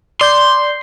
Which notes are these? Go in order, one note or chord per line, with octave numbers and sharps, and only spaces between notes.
D5 C6 G6